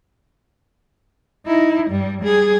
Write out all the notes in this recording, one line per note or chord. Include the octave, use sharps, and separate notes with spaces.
D#4 E4
G2 G3
G3 G#4